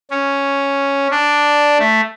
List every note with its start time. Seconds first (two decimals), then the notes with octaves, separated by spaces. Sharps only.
0.11 C#4
1.11 D4
1.79 A3